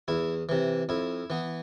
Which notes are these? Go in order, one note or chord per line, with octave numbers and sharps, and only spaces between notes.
E2 E4
C3 E3
F2 E4
E3 B3